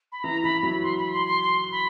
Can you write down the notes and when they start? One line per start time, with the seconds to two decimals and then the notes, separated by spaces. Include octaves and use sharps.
0.12 B5
0.24 E3 A#5
0.43 E3 B5
0.63 F#3 B5
0.83 C6
0.98 B5
1.13 C6
1.27 C6
1.43 C6
1.72 B5